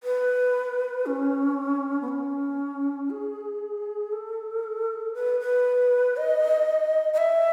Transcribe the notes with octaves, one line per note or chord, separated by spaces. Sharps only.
B4
C#4
B3
C#4
G#4
A4
B4
B4
D#5
D#5
E5